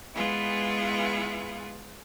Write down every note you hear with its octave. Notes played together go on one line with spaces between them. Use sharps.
G#3 B3 E4 F4 G#4 B4